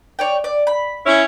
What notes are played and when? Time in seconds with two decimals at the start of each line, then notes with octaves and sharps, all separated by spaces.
0.19 C#5 D5 G5
0.44 D5
0.67 B5
1.06 C#4 E4